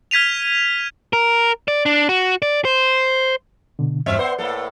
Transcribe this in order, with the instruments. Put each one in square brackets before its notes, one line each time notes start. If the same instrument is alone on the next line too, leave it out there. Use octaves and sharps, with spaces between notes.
[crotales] F6 G#6 B6 D#7 F7
[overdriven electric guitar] A#4
D5
D4
F#4
D5
C5
[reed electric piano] B2 D3
[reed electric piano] E2 G2 F6 [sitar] A#2 C4 E5
[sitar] B3 C5 [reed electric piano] B4 D5 F#5
[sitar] A2 A#3 A4